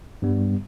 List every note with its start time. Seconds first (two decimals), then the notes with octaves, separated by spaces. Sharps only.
0.22 G2 G3 B3